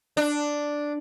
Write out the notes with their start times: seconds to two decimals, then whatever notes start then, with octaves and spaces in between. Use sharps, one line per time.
0.17 D4